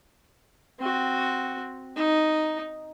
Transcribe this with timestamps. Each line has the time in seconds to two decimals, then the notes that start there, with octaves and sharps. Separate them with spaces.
0.79 C4 F#4
1.96 D#4